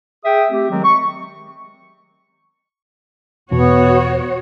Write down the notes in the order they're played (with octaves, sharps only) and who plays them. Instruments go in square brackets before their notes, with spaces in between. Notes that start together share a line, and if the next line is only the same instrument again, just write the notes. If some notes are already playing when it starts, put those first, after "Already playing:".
[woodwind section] G#4 E5 G5 D#6
A3 C4 G4
D#3 F#3 G#3 C4
C#6
[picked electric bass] E2 B2 [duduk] B3 [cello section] F#4 C#5